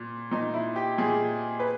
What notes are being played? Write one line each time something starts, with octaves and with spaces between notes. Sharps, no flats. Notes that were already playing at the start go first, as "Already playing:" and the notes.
Already playing: A#2
A#2 D#4
E4
G4
A#2 G#4
B4